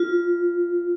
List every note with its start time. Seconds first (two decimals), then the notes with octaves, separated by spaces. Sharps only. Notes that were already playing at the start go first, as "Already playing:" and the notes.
Already playing: F4